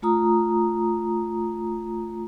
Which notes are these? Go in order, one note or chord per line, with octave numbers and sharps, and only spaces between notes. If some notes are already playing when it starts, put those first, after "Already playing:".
A3 F4 A#5 D#6